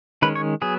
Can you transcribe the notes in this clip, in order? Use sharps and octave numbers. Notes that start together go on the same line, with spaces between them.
D#3 G#3 C#4 B4
C#5
F#3 B3 G#4